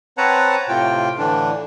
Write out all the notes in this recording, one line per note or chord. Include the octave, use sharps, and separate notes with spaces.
C4 B4 C#5 F#5 A5 A#5
A2 C3 F4 G5
A2 D3 E3 D4